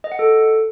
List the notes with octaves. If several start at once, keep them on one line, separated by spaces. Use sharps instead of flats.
D#5
F#5
A4